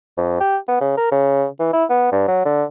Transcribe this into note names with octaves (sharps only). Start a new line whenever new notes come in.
F2
G4
B3
C#3
A#4
C#3
E3
E4
B3
G2
F#3
D3